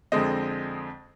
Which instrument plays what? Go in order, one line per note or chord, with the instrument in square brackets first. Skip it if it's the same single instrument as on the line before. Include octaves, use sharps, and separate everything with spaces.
[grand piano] F2 D3 G#3 C4 D#5